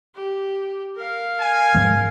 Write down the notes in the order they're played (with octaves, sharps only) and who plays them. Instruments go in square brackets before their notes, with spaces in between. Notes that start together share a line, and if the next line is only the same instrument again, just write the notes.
[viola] G4
A#4 F5
[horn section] G#5
[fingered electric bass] G#2 F3 G#3